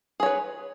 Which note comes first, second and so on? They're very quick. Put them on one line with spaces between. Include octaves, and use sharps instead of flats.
G#4 C#5 B4